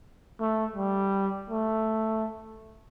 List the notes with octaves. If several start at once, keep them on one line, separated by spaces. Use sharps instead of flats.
A3
G3
A3